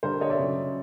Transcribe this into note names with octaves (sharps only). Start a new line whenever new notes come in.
D3 G3 A#4 C5
C#5 D#5
D5 E5
C#3 F#3